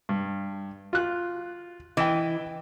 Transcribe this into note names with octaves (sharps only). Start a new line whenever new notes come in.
G2
F4 F#6
E3 D#5 G5